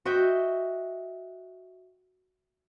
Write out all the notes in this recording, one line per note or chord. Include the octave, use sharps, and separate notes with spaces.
F#4 D#5 E5 G5